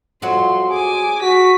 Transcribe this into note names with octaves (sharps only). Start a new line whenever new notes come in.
F2 F#3 F#4 C6
G#4 G#5 D6
F#4 B6